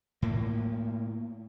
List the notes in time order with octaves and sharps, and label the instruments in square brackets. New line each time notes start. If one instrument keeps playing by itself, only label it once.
[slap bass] A2 A#3